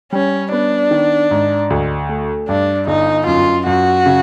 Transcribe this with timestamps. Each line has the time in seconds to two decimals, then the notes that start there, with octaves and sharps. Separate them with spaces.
0.12 G3 C#4
0.52 B3 D4
0.91 D#3
1.31 G#2
1.70 D2
2.09 A3
2.48 G2 D4
2.87 G1 D#4
3.27 F#2 F4
3.66 F#2 F#4
4.06 C#3